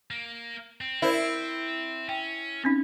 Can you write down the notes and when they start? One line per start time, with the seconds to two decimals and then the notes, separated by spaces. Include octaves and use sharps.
0.11 A#3
0.81 C4
1.02 E4 A#4 C5 D5
2.09 C#4 G5
2.64 C4 C#4 D#4